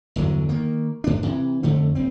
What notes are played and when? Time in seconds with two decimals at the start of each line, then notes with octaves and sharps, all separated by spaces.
0.16 G1 E2 D3 F#3
0.49 D#3 A#3
1.04 G2 D4
1.23 C3 E3
1.63 F2 D3 A3
1.95 F#1 C4